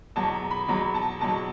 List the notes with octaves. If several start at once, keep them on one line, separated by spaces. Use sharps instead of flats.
E2 B2 F#3 A5
A#5
B5
E2 B2 F#3 A#5
A5
E2 B2 F#3 A5